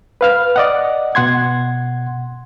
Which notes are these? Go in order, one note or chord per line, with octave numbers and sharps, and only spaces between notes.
B4 F5 F6
D5 D#5 F#5
B2 F#5 C6 G#6